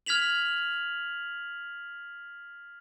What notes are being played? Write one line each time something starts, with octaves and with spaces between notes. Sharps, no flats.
F6 G#6 B6 F7 F#7